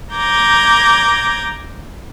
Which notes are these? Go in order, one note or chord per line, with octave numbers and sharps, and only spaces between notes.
A#5 D6 G6 G#6 A#6